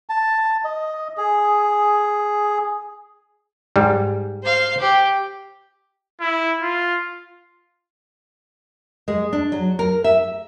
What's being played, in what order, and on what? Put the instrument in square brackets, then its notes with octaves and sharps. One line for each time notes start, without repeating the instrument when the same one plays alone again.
[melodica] A5
D#5
G#4
[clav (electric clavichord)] G#2 G3
[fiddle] C5 F5
G4
[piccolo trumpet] E4
F4
[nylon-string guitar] G#3
D4
F#3
A#4
E5